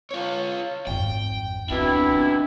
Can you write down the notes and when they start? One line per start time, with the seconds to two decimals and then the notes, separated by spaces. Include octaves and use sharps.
0.11 F4 C#5
0.87 G#1 F2 G5
1.70 D2 B2 E3 C4 D4 E4
2.10 C#4 F4